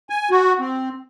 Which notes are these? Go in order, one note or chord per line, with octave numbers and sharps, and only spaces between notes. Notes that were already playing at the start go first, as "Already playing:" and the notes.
G#5
F#4
C4